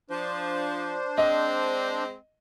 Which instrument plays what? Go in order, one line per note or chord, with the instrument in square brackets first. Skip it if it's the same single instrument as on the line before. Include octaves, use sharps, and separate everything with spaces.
[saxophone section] F3 [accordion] D4 C5
[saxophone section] G#3 C4 [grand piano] D#5